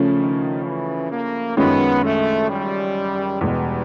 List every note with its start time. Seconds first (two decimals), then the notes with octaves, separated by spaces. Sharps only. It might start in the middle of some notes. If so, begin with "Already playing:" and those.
Already playing: C#3 F3 A3 C#4
0.18 D#3
0.65 E3
1.12 A#3
1.57 F#2 D#3 G#3 B3 C#4 F4
2.04 A3
2.49 G3
3.41 E2 B2 G3 G#3